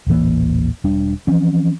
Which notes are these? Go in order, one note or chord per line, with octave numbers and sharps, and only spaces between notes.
D#1 A1 E3 A#3
E1 G3 D4
E3 F3 C4 C#4